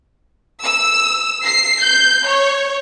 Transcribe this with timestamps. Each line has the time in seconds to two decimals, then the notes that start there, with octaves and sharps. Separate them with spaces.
0.63 E6
1.45 C7
1.83 G6
2.27 C#5